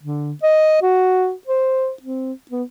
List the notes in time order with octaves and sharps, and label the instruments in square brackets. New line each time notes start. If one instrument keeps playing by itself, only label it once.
[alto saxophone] D3
D#5
F#4
C5
C4
B3